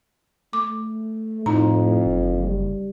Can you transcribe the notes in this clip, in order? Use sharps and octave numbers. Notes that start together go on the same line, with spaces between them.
A3 D6
F2 A2 D#4 A#5
F#1
G3